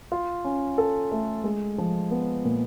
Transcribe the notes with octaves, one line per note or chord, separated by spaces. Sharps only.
F4
C#4
A4
A3
G#3
F3
B3
A#2